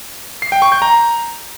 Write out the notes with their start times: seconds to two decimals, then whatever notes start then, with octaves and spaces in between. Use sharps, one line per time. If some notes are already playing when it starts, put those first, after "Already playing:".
0.42 C7
0.52 G5
0.62 C#6
0.72 G6
0.82 A#5